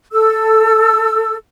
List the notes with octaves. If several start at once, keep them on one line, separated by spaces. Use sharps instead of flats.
A4 E6